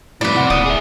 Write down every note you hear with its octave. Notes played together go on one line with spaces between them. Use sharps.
F2 A2 E4 B4 D5
C3 F#5
D1 A#3 D5 D#6
G#4 E5